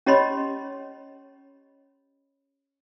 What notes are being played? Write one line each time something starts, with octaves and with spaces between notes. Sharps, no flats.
C#4 G4 C#5 D#5 B5 C6